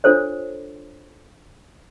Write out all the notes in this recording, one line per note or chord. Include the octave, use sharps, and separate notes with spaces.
D4 F4 A4 C5 C#5